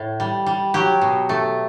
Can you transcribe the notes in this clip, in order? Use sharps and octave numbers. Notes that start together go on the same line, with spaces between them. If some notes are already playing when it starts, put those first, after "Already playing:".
Already playing: A2
G3
G3
F#3 G4
B2
A3